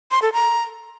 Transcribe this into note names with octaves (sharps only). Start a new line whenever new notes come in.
C6
A4
A#5